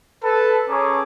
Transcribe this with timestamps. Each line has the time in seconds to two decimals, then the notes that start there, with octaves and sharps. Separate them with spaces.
0.23 A4 B4 A5
0.69 C#4 G#4 A4 C#5 A#5 D6